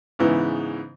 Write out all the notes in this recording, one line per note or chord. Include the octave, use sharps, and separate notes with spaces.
G#2 C#3 E3 B3